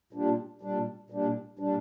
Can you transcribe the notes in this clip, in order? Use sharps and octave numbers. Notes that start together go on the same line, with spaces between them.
A#2 G3 D4
A#2 G3 D4
A#2 G3 D4
A#2 G3 D4